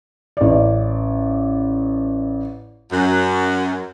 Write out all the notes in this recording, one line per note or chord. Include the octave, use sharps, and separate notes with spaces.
A1 D5
F#2